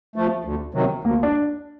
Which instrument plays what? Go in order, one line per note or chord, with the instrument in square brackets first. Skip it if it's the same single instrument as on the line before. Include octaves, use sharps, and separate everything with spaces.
[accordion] F3 A3
D2
C3 D#3 F#3
[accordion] D2 [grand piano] A#3
[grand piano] D4